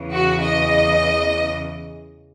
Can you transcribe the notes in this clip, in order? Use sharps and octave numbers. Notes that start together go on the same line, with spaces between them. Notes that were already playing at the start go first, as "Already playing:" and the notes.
Already playing: E2 C#3 E3
F#4
D#5